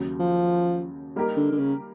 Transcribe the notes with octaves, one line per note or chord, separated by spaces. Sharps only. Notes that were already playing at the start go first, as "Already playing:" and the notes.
Already playing: D#2 C#3 F#3
F3
G3 A#3 D#4 G4 A#4
D3
D3
C#3